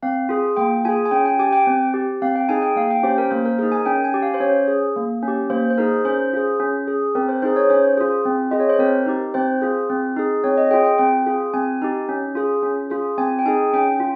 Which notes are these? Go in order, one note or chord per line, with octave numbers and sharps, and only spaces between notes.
C4 F5
F4 G#4
A#3 G5
F4 G#4 G#5
G#5
C#4 G5
G5
G4 G#5
G5
C4
G4
C4 F5
G5
D#4 G#4 G#5
G5
A#3 F5
G5
C#4 G4 C5
A#4
A#3 C5
A#4
D#4 G#4 A#4
G#5
C#4 G5
G#5
G4
F5
C5
C#4 C#5
G#4
A#3
C#4
G4
A#3 C5
C5
D#4 G#4 A#4
C#4 C5
F4 G#4
C#4
G#4
C4 A#4
C5
D#4 G#4 C5
C#5
C#4 C5
F4 G#4
C4
F4 G#4 D#5
C#5
C5
C4 A#4
D#4 G4
C4 C5
F4 G#4
C4
D#4 G#4
C4 C#5
D#5
F4 G#4 G5
G5
C4 G5
F4 G#4
C4 G#5
D#4 G4
C#4
F4 G#4
C#4
F4 G#4
C4 G#5
G5
D#4 G#4 G#5
C#4 G5
F4